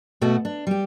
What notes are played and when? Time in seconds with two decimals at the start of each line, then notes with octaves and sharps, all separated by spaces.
0.21 B2 A3 B3 F#4
0.45 D4
0.67 G3 G4